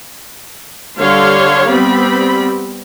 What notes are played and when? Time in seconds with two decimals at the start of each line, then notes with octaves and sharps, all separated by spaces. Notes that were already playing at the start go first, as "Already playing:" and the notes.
0.98 D3 G3 C#5 F5 C6
1.68 G3 B3 C4 B5